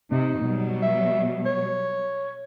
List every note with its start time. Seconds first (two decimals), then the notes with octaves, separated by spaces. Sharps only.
0.11 C3 D#4
0.40 B2 F#3 G3
0.82 E5
1.45 C#5